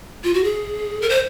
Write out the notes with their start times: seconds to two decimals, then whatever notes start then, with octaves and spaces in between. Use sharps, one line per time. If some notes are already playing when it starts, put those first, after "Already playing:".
0.24 F4
0.34 F#4
0.44 G#4
1.01 A#4
1.09 C5